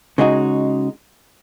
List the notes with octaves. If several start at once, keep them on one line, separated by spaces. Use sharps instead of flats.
C#3 G#3 D#4 F#4